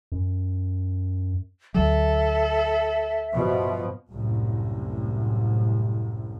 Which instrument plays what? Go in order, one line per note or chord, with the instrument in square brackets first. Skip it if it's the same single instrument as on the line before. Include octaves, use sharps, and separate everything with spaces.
[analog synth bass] F#2
[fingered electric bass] D2 F#3 [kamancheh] A4 [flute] E5
[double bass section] G2 B2 F3
C2 F#2 A2